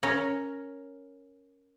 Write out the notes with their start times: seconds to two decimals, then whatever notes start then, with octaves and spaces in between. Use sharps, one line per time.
0.03 C#4 A#4 C#5